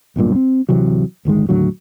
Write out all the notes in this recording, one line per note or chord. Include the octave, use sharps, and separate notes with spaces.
D1 B1 G2 A#2
C4
D1 C3 E3 F#3
D1 G1 D#3 G#3
D#2 A2 D3 F#3